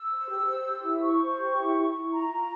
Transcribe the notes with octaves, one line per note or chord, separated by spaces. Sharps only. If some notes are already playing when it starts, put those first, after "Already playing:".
Already playing: E6
C5
G4
C5
G4
E4
C5 C#6
C5
G4
E4
E4
E4
F4 A#5
F4